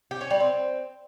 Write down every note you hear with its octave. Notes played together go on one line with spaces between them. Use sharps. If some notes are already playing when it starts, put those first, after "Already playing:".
G4
C#4
G3
C4